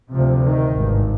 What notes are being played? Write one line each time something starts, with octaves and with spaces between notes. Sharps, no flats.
D2 C3 F3
D#3
G#1 G2